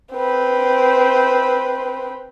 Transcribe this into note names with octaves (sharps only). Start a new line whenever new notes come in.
C4 B4